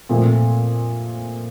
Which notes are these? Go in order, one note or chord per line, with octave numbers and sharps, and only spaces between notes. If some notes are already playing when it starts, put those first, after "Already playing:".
A#2 F3 A3 C4